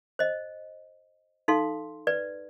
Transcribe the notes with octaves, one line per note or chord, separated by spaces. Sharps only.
C5 D#5
D#4 A4 F5 C6
B4 D5